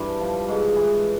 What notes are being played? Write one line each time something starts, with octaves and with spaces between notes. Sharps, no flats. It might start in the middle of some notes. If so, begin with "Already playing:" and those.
Already playing: G2 E3 E4
F3
G#2
E3